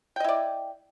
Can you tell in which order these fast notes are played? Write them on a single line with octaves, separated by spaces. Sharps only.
G5 D#5 E4 D5